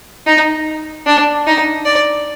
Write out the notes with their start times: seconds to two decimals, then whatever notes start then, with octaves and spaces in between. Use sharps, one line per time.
0.27 D#4
1.07 D4
1.47 D#4
1.86 D5